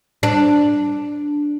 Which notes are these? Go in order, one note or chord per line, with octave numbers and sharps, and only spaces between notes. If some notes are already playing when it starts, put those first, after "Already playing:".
D4